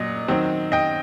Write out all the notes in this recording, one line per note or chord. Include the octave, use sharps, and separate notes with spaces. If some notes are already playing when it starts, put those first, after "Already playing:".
Already playing: A#2 F#3 D#5
D#3 F#3 C4
D#5 G5